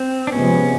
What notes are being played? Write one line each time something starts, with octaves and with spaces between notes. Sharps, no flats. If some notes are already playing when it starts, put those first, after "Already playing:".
Already playing: C4
D4
C3 F3 G#3 B3 C#4